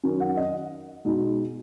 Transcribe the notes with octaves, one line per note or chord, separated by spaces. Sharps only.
D#3 F#3 C#4
F#5
D#5
B2 G#3 D#4